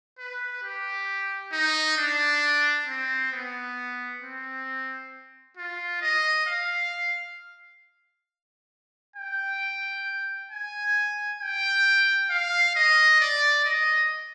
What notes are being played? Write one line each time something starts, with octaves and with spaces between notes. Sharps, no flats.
B4
G4
D#4
D4
C4
B3
C4
F4
D#5
F5
G5
G#5
G5
F5
D#5
D5
D#5